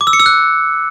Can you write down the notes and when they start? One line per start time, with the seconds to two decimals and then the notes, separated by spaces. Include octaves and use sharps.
0.01 D6
0.07 E6
0.13 C#7
0.20 E6
0.26 F#6